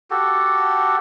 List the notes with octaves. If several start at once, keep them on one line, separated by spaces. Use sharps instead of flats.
F#4 G4 A4